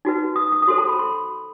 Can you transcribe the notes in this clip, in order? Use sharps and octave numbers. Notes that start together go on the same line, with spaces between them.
D#4 F#4 B4
D#6
D#6
D#6
F#4 A4 C5 C6
A5
B5
C6